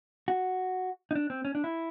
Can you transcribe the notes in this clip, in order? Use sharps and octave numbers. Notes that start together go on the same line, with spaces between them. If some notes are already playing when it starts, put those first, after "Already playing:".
F#4
D#4
D4
C4
C#4
D4
E4